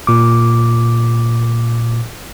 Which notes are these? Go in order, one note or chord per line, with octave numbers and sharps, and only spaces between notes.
A#2 D6